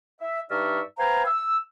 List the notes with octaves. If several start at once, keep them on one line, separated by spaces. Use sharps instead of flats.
E5
G2 D#4 D5 E5 C#6 F6
B4 C5 F5 G5 G#5 A#5
E6